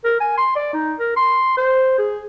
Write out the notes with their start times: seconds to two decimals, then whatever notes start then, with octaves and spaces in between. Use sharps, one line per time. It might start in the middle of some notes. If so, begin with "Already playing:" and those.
0.04 A#4
0.20 G#5
0.38 C6
0.55 D5
0.73 D#4
0.99 A#4
1.16 C6
1.57 C5
1.98 G#4